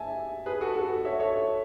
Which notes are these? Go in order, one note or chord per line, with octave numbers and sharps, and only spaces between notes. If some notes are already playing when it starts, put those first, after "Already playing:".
Already playing: E5 G#5 A5
G#4 B4
F#4 A4
F#4 A4
C#5 E5
A4 C#5